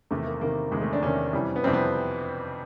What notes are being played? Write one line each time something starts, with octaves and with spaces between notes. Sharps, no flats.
E2 C3 D#3 A3
A#3
E2 C3 D#3 A#3
E2 C3 D#3 G#3
A3
D4
E2 C3 D#3 C#4
F2 C3 E3 G3
B3
F2 C3 E3 G3 C4
B3